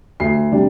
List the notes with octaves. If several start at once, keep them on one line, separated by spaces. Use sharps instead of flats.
D2 C7
C3 G3 D4